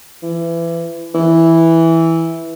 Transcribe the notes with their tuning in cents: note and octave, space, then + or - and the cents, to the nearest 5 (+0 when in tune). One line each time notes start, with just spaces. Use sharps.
E3 +25
E3 -5